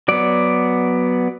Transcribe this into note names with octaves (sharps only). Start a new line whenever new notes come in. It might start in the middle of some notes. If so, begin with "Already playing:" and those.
F#3 B3 D5